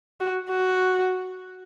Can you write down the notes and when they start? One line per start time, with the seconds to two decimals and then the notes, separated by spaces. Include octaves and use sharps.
0.20 F#4
0.50 F#4